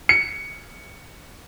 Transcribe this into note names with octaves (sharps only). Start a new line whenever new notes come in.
C#7